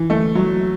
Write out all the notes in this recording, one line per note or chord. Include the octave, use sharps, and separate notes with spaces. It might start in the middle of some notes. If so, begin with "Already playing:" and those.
Already playing: E3
A3
F#3